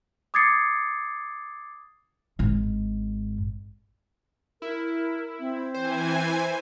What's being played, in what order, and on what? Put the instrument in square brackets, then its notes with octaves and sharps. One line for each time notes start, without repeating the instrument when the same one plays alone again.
[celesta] D6 D#6 G#6 A6 C7 C#7
[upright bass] G#1 G#2
[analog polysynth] E4 [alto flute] A#4
[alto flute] C4
[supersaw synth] E3 G#5 [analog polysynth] C5